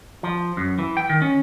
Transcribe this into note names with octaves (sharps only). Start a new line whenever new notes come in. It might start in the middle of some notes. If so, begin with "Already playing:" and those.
F3
F#2
E3
G5
D#3
C#4